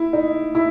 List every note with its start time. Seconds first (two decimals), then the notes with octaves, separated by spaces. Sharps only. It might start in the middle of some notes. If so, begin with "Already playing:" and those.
Already playing: E4
0.13 D#4
0.55 E4